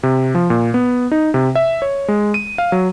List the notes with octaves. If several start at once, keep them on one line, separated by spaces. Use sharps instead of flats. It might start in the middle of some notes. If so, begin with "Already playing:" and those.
C3
F3
A#2
B3
D#4
C3
E5
C#5
G#3
D#7
F5
F#3